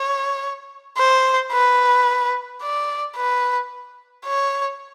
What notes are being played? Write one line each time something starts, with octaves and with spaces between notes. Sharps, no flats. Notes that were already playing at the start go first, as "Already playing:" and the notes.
Already playing: C#5
C5
B4
D5
B4
C#5